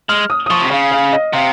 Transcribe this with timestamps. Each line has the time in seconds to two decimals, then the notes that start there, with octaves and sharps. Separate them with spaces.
0.09 G#3 F6
0.30 D#6
0.46 D#6
0.50 F3 C#6
0.61 C3
0.71 C#3 F5
0.92 F5
1.13 D#5
1.33 C3 F5